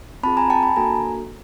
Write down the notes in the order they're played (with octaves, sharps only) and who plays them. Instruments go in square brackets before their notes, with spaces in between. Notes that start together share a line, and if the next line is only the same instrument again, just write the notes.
[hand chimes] C4 F4 G#4 A5 B5
G#5 A#5
G5 A5
A5 B5
A#3 D4 F#4 A4 G#5 A#5